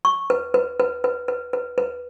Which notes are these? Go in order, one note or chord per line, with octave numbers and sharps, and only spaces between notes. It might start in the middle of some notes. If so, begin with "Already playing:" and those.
C#6
B4
B4
B4
B4
B4
B4
B4